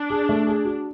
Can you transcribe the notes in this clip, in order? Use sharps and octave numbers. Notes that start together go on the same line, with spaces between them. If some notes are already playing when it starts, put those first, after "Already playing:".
Already playing: D4
G#4
A3
G#4
F#4